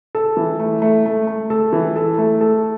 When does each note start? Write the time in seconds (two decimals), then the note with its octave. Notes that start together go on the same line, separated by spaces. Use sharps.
0.15 A4
0.37 E3
0.60 A3
0.82 A3
1.06 A3
1.27 A3
1.50 A4
1.73 E3
1.96 A4
2.18 A3
2.41 A4